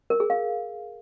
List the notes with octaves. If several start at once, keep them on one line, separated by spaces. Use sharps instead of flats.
A#4
G#4
F5